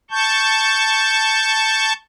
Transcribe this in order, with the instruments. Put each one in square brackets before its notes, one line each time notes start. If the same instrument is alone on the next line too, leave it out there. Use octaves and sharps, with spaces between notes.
[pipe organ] A5 C#6 G6